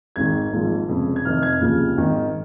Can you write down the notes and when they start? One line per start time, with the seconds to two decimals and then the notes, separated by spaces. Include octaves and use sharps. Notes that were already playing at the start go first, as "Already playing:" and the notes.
0.16 G#1 G#2 D#3 G#6
0.52 G#1 G#2 F3
0.89 F1 F2 C#3
1.16 G#6
1.25 F1 F2 D#3 F6
1.43 G#6
1.61 F1 D#2 C#3 F3 F6
1.97 G#1 G#2 D#3